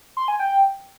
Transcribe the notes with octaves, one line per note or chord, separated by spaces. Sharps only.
C6
G#5
G5